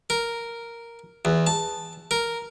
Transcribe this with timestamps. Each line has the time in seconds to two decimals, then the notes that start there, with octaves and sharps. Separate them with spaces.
0.10 A#4
1.25 E2
1.47 A5
2.11 A#4